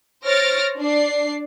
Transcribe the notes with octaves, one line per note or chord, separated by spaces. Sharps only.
C5 C#5 F6 A6 A#6 D7
D4 D5 C7